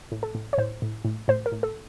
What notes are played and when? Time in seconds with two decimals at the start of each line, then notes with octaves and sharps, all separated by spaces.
0.12 A2
0.23 A4
0.35 A2
0.53 C#5
0.58 A2 C5
0.82 A2
1.05 A2
1.28 A2 C5
1.46 A#4
1.52 A2
1.63 A4